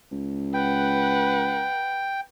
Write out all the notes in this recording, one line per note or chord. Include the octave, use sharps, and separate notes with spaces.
C#2
B4 F#5 G5